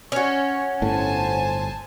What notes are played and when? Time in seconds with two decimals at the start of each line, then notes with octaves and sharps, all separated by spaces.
0.12 C#4 F#4 C#5
0.82 G1 A2 C5 G#5 A5